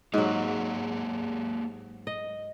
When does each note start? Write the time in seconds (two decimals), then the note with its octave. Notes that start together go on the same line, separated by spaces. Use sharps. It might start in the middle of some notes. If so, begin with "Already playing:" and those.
0.13 G#2 F#3 A#3 G4 G#4
2.07 D#5